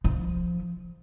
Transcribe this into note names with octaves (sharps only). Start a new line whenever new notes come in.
F3